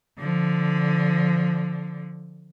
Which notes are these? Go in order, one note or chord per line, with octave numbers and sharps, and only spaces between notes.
D3 F3